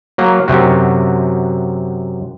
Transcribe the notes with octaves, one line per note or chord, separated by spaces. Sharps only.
F#3 A#3
F#2 C3 F#4